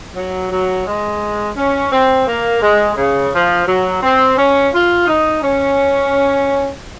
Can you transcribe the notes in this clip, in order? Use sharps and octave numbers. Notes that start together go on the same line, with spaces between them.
F#3
F#3
G#3
C#4
C4
A#3
G#3
C#3
F3
F#3
C4
C#4
F4
D#4
C#4